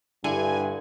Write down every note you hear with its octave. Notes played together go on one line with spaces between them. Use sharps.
G2 D3 E4 G#5